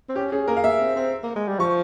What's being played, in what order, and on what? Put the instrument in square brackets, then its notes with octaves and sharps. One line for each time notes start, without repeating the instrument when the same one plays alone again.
[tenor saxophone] C4
[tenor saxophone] C#4 [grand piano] G4
[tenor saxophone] C#4 [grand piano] G#4
[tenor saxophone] A#3 [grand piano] A#4
[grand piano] F5
[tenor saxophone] A#3 [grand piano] E5
[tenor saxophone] C4
C4
A#3
G#3
G3
[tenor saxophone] F3 [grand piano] C#6